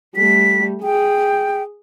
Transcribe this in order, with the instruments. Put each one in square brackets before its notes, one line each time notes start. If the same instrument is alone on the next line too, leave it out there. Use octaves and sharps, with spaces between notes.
[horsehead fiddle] G3 A3 [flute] B6
[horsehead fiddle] G#4 [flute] G5